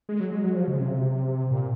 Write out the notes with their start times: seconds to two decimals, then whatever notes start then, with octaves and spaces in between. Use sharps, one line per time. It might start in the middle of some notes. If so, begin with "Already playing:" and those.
0.09 G#3
0.20 F#3
0.32 G#3
0.44 F#3
0.56 F3
0.68 C#3
0.80 C3
1.51 A#2